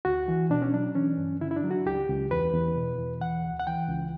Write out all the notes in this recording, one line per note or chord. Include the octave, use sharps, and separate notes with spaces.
D2 F#4
E3
B2 D4
C#4
F#3 D4
E3 C#4
G2
D3 E4
E4
D4
F#3
F#4
C#2 G4
C#2
E2 B4
E2
B2
E2
E3 F#5
D2
F#5
E3 G5
C#2